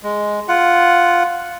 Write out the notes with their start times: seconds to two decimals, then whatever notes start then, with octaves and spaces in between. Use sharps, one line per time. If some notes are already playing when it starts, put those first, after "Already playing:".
0.03 G#3
0.48 F4 F#5